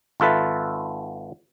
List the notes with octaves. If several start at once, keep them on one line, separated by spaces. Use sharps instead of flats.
G#1 F4 A4 B4 E5